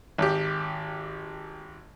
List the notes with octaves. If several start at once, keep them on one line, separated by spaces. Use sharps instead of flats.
G#1 G4